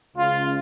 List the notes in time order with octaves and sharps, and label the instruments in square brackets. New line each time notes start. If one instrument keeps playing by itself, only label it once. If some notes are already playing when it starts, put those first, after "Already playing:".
[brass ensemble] C#2 C#3 G#3 F4